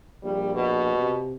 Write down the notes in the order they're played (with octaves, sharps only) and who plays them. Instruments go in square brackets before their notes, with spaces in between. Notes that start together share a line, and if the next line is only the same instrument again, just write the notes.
[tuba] A#1 [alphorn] G3
[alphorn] B2
[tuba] C3